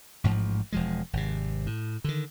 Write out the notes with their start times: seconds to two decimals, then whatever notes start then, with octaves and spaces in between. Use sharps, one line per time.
0.24 A1 G#2 F3
0.72 E1 F3 G#3
1.13 G#1 C3
1.66 A2
2.04 D3 D#3